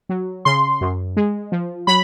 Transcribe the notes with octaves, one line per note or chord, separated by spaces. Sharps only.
F#3
C#3 C6
F#2
G#3
F3
F#3 B5